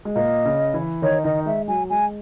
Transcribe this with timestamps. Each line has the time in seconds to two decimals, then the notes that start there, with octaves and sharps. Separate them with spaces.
0.05 G#3
0.15 A#2 A#3 D#5
0.45 C#3 C#4
0.74 E3 E4
1.02 D#3 D#4 C#5
1.24 D#3 D#4 D#5
1.46 G#3 E5
1.68 F#3 G#5
1.90 G#3 G#5